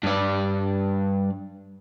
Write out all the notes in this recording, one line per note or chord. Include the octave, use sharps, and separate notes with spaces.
G2 D5